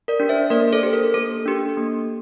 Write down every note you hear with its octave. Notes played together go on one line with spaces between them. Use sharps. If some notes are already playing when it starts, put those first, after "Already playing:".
A#4 D5
D4 G4
C5 E5
A#3 A#4 D5
A4 C5
D4 G4 C5
A#4
A#3 A4
D4 G4
A#3